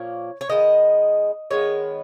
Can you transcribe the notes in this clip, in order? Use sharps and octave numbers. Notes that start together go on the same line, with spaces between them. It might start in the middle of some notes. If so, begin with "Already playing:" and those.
Already playing: A#2 F3 A#3 C#5
C#5
D#3 G#3 B3 D#5
D#3 G#3 B3 C#5